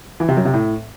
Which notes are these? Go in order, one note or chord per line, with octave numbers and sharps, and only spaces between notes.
E3
C3
F#2
C3
A2